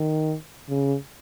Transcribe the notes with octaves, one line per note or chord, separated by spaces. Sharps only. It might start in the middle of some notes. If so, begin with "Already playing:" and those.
Already playing: D#3
C#3